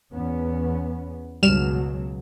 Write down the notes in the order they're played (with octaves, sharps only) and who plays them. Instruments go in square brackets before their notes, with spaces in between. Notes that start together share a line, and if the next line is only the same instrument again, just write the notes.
[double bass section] E2 B3 C#4
[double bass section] C#2 B2 F#3 [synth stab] G2 F6 E7